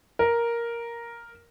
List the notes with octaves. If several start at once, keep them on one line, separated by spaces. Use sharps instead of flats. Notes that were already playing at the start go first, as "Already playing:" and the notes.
A#4